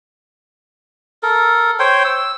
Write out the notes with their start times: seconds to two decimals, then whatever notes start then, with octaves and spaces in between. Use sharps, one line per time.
1.23 A4 A#4
1.79 C5 C#5 G5
2.05 E6